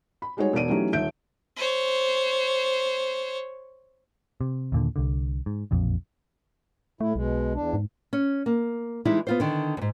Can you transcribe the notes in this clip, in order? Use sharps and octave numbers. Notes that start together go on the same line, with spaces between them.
B5
G3 G#3 D#4 F#4 C#5
E1 B2 D5 D7 D#7
E3 F#3 A3 C#4 D#4 G4
D#1 D#3 E5 G6 D7
C5 C#5
C3
D#2 A#2 D3
C2 D3
G#2
E1 A#1 F2
A2 A3 E4
B1 B2 G#3
E2 D4
G#2
C#4
A#3
E3 G3 G#3 D#4 E4
B3 F4 C5
D3 D#3
F2 G#2